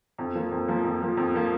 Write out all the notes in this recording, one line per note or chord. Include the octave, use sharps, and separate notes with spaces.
F2
F3 A#3
F2
F3 A#3
F2
F3 A#3
F2
F3 A#3